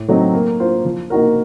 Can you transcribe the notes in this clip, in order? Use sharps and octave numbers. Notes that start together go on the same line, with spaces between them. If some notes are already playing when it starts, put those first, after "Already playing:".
Already playing: A2
F#3 A3 C4 D#4
A#3
F4 C5
F3
A#3 D#4 F#4 A#4